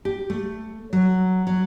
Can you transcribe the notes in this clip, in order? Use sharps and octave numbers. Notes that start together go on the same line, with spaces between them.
G4
A3
F#3
F#3